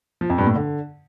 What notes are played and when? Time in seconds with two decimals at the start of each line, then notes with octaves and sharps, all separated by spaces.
0.21 F3
0.30 F2
0.38 G2
0.47 A2
0.56 D3